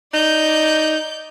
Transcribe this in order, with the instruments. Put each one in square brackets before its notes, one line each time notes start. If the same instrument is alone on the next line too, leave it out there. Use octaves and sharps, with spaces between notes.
[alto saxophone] D#4 [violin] D5 G6